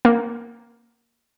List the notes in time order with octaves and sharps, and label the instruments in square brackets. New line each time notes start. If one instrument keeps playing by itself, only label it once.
[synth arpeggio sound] A#3